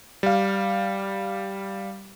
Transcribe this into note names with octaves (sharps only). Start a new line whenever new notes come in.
G3 F5